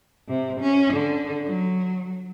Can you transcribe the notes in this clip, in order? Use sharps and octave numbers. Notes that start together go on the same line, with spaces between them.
C3
C#4
D3
F#3